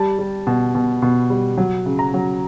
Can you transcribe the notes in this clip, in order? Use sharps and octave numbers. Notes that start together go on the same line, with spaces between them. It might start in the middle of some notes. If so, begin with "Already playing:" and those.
Already playing: G3 A5
G3
B2
B2
B2
G3
F#3
C#3
A#5
F#3